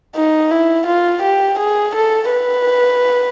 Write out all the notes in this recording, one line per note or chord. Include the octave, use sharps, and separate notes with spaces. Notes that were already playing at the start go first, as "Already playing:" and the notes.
D#4
E4
F4
G4
G#4
A4
B4